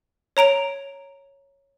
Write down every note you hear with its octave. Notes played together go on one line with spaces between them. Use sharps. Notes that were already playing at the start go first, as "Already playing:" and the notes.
C#5 A#5 D7 F7